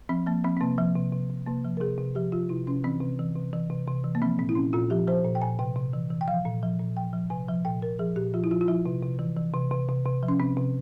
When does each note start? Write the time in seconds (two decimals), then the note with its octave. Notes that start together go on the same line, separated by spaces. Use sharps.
0.09 F3 C4
0.26 F3 A#3
0.44 F3 C4
0.57 C4
0.61 C3 A#3
0.78 F3
0.95 C3
1.12 C3
1.30 C3
1.46 C3 A#3
1.64 F3
1.77 A#4
1.81 C3 G#4
1.98 C3
2.15 F3 G4
2.32 F3 F4
2.49 C3 E4
2.67 C3 C#4
2.84 E3 C4
3.01 C3
3.19 E3
3.36 C3
3.53 E3
3.70 C3
3.87 C3
4.04 E3
4.15 A#3
4.22 F3 C4
4.39 A#2 C4
4.49 E4
4.55 A#2 C#4
4.73 A#2 F4
4.90 F3 G4
5.07 F3 C5
5.25 A#2
5.35 G5
5.41 A#2 G#5
5.59 C3 G5
5.76 C3
5.93 E3
6.10 E3
6.21 G5
6.28 F3 F5
6.45 A#2
6.63 F3
6.79 A#2
6.97 F3 G5
7.13 F3
7.30 C3 G#5
7.48 F3
7.65 A#2 G5
7.82 A#2 A#4
7.99 F3 G#4
8.16 A#2 G4
8.34 F3 F4
8.44 E4
8.51 F3 F4
8.61 F4
8.68 F3 E4
8.86 C3
9.02 C3
9.19 E3
9.37 E3
9.54 C3
9.71 C3
9.88 C3
10.05 C3
10.23 F3
10.28 C#4
10.40 C3 C4
10.57 C3